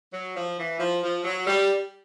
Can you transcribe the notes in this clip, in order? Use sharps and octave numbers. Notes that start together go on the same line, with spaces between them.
F#3
F3
E3
F3
F3
F#3
G3